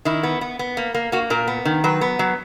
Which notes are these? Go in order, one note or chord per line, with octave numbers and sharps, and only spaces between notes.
D#3 E4
B3
B3
B3
A#3
A#3
A#3 F#4
A#2 A#4
B3
D#3
F#3 B4
B3
F#3